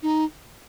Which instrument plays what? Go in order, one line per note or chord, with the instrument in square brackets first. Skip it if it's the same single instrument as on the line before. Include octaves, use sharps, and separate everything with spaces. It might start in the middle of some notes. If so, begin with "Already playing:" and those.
[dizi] D#4